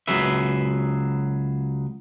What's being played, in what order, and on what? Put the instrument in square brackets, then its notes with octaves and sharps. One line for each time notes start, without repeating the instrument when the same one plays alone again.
[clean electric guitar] C#2 F#3 G#4 B4 E5